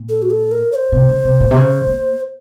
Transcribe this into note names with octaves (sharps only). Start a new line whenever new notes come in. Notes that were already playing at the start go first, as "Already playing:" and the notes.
Already playing: A#2
A4
F#4
A4
A#4
C#5
C5
C3
C#3
C3
A#2
C3
C#3
A#3